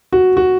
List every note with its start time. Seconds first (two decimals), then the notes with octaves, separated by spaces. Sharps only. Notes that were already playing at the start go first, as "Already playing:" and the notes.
0.13 F#4
0.37 F#4